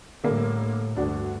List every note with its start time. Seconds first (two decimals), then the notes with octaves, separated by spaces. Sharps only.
0.24 A2 D3 G3 A#3
0.96 D2 G2 D4 F#4